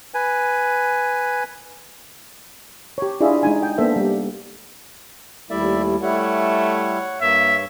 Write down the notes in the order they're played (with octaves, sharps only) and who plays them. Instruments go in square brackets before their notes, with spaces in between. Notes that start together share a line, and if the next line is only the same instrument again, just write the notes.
[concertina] B4 G#5
[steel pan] G4 C#5
D4 E4 F4 G#4 D#5 E5
G#3 D#4 G#5
G5
A#3 B3 D4 A4 C5 E5
G3 G4
[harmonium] D#2 G3 E4 [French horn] A3 [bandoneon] D5 E5
[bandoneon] G3 E4 [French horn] A3 [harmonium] C#5 F#5
[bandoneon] G2 [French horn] A#3 [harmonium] C#5 [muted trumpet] E5